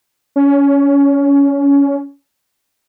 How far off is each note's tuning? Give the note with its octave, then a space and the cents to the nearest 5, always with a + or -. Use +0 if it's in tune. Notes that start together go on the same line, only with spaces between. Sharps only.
C#4 +20